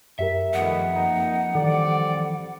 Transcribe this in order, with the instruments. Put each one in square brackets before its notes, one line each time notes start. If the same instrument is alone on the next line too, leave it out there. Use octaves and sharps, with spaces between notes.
[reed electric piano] F#2 G4 A#4 [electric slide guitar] E5
[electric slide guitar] F2 [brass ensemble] D#3 A3 B3 [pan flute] F#5
[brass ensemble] A#3 D#4
[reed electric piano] D#3 E3 A4 [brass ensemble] G3 C4 D5